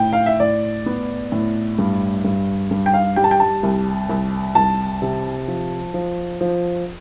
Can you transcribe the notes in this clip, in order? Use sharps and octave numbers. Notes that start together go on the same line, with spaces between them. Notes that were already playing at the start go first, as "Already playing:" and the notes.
Already playing: A2 G5
F5
E5
A2 D5
B3
A2
G2
G2
G2
G5
F5
G3 G5
A5
G5
A5
C2
C2
C2 A5
C3
F3
F3
F3